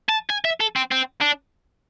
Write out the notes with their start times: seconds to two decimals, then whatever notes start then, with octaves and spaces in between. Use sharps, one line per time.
0.09 A5
0.30 G#5
0.45 E5
0.60 A4
0.76 C4
0.91 C4
1.21 D4